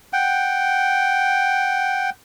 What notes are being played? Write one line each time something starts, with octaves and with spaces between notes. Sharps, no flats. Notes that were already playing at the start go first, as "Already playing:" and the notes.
F#5 G5